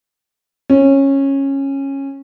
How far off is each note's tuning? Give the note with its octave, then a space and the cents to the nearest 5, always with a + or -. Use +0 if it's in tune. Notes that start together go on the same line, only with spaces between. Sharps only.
C#4 -15